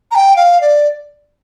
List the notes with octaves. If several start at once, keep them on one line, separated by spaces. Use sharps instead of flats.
A#5
G5
F5
D5